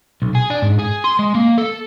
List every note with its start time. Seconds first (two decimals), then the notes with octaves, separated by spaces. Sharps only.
0.22 B1
0.35 G#4
0.50 D4
0.62 G#2
0.79 G#4
1.04 C6
1.19 G#3
1.35 A#3
1.58 A4